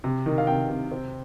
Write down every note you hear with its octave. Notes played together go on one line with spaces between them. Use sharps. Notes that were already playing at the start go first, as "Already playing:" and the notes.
C3
D#3
F5
C3 G5
C3
C4